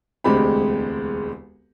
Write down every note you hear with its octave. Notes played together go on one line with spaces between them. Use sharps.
E1 D2 G#3 C4 G4 B5